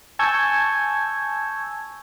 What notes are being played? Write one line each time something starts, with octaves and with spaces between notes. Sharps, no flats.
G#5 A5 C#6 E6 G6 G#6